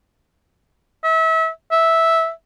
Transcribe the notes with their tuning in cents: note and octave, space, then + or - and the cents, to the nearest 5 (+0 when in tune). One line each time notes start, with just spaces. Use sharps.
E5 -30
E5 -10